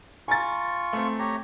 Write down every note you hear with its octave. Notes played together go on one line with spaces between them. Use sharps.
F4 G#5 A#5 C#6 A6
A3 C4
G4 C#5 A#5